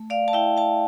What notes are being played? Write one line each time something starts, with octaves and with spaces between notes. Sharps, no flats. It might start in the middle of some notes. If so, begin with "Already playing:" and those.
Already playing: A3
D5 F5
A5
E4 E5 G5
F5 A5